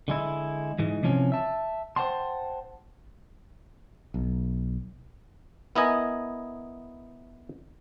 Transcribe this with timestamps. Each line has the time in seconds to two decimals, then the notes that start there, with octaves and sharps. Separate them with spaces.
0.08 D3 G#3 E4
0.79 G#2 E3 G#3
1.03 C3 E3 F3 C#4
1.32 E5 A5
1.96 C5 F#5 G5 A5 C6
4.14 B1
5.75 B3 E4 A#4 D#5 G#5